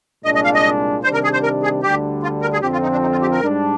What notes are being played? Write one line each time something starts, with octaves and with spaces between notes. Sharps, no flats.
C2 A#2 G#3 D4 D#5
D#5
F5
D#5
C3 D#3 G3 D4 C5
A#4
G#4
C5
A#4
G#4
D2 D3 G3 D4 G4
F4
A#4
G#4
F2 D3 F3 C4 G4
F4
D#4
D4
D#4
F4
G4
A#4
G#2 G3 D4